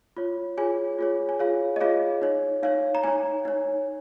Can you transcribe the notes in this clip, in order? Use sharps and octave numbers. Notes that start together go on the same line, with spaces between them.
F4 C#5
F4 G#4 C#5 G#5
F4 G#4 C#5
G#5
F4 G#4 C#5 F5
D#5
F4 G#4 C#5 F5
D#4 C#5
D#4 C#5 F5
A#5
D#4 C#5 G#5
D#4 C#5